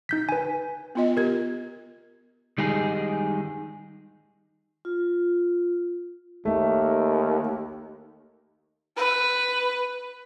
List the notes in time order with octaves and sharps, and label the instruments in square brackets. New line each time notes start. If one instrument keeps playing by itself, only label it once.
[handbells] D#4 G6 B6
B4 G#5
[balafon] B3 F4 D#5
[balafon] G4 [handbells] A#4 G#6
[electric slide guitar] D#3 G3 G#3 D#4 G#4
[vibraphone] F4
[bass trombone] D#2 [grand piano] A3
[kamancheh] B4